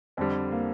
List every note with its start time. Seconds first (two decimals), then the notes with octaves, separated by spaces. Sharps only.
0.17 F2 D3 G3 C4
0.51 A#3